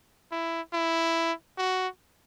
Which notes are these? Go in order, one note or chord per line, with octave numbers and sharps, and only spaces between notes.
E4
E4
F#4